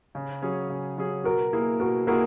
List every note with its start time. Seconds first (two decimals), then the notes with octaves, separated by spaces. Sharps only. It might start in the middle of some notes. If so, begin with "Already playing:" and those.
0.15 C#3
0.42 F#3 C#4 G#4
0.69 C#3
0.97 F#3 C#4 G#4
1.24 B2 F#4 A#4
1.53 A#3 E4 G#4
1.80 B2 F#4 A#4
2.07 A#3 E4 F#4 G#4 A#4